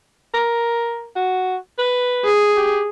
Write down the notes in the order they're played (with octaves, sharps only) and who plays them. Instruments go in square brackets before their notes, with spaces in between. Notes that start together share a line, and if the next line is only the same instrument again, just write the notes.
[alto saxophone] A#4
F#4
B4
[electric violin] G#4
[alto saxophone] G4